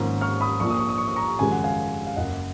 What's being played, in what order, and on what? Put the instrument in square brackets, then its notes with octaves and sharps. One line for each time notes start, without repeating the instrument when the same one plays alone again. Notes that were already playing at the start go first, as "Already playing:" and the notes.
Already playing: [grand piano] G#1 G#2 F3 A#3 C#4
C#6 F6
B5 D#6
A#1 A#2 F3 C#6
D#6
C#6
D#6
C#6
D#6
A#5 C#6
G#1 F#2 C#3 F3 G#3 G#5
F#5
F5 G#5
F5
F#1 F#2 C#3 D#5 F#5